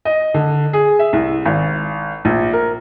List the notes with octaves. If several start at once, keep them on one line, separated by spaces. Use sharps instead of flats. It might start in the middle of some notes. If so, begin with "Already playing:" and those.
D#5
D3
G#4
E5
C2
G#1
A#1
A#4